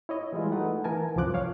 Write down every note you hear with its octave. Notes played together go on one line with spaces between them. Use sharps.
E4 C#5 D#5
E3 G3 G#3 E4 F4
A3 D#4 B4 F#5
E3 A#4 G#5 A5
C2 F#2 F3 D6 F#6
C#5 F5